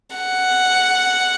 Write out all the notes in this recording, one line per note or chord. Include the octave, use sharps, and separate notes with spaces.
F#5